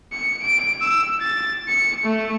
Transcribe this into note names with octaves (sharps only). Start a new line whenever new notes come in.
C#7
D7
E6
A6
C#7
A3